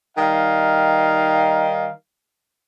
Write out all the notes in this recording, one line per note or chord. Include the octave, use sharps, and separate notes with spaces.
D#3 G3 D#4 F5